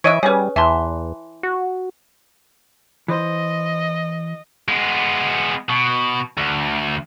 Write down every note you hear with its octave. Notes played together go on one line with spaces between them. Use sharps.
E3 C#5 D#5 E5 G#6 D7 D#7
G3 C#4 G#4 B4 C#5
E2 E3 E5 A5 C6
F#4
E3 C5 D#5
G#3 B3
B2
D2